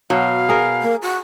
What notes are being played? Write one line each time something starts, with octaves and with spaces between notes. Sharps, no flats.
B2 F#3 F5
G#4 A#4
A#3
F#4